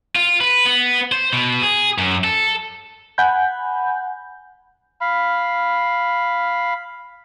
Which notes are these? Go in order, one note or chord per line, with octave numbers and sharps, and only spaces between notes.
F4
B4
B3
C5
B2
G#4
F#2
A4
F#5 G#5 B5 G6
F5 B5